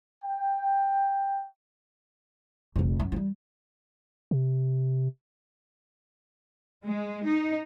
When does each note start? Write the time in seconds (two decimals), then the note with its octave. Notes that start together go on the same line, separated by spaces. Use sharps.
0.24 G5
2.76 F1 A#1
3.00 F#2
3.12 F3 G3
4.31 C3
6.86 G#3
7.26 D#4